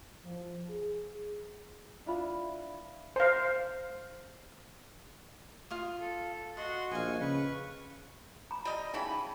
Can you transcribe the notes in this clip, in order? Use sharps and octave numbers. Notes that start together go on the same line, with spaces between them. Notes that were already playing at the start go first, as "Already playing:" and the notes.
F3
G#4
D4 E4 F4 B5
C5 F5
F4 F5 D#6
A4
F#4 D#5 F#5 C6
A#1 D#5 F5 G#5 C#6
C#3 B4 C#6
A#5 B5
G3 D#5
C#3 D#4 E4 G#4 G5 B5